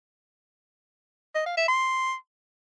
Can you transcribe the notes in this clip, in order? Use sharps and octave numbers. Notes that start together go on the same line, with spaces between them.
D#5
F5
E5
C6